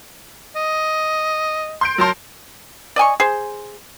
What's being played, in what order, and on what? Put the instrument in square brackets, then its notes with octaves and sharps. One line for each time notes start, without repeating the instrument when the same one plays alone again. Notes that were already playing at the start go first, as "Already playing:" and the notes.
[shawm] D#5
[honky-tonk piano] C6 G6 D7
[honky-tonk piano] F#3 A5 C6 [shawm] A#4
[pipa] D5 D#5 G#5 C#6
G#4 C5